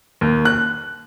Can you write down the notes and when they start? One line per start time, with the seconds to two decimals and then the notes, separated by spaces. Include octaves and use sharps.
0.21 D#2
0.45 F#6